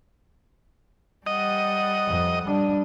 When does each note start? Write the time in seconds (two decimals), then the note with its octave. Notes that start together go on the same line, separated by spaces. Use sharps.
1.26 G3 D#5 F#5
2.07 F2
2.45 G3 D4